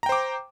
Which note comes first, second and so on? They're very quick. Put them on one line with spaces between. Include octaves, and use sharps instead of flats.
A#5 G5 C5 D6